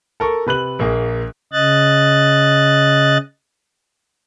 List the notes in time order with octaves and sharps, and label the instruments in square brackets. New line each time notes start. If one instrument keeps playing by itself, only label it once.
[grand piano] A4 A#4 C#6
C3 B4 F#6 F#7
A#1 A#3 G#4
[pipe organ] C#3 D#5 F#6 A6